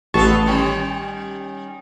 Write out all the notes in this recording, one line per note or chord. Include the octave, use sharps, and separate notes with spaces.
A1 B3 F4 A4 A5 C#6
D#3 G3 C#4